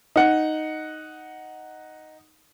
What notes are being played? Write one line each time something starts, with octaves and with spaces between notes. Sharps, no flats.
D#4 F#5